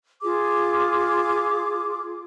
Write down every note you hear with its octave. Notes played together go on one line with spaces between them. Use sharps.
F4 G#4 D6